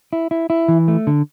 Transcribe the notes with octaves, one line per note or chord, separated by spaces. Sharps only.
E4
E4
E4
E3
A3
D3